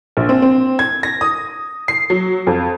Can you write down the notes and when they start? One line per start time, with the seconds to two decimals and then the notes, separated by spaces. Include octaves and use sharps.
0.17 A#1
0.29 C4
0.42 C4
0.79 G#6
1.03 A#6
1.21 D#6
1.88 C7
2.10 F#3
2.47 F2